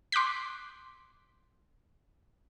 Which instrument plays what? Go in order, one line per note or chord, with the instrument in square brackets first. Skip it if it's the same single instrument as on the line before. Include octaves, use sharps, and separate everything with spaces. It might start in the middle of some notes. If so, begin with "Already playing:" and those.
[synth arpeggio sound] C6 D6 F#6 G6 B6